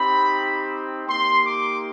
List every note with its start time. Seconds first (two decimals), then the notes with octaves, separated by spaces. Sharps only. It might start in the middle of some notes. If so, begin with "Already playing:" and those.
Already playing: C4 D#4 G4 B5
1.08 A#3 D#4 G4 C6
1.45 D6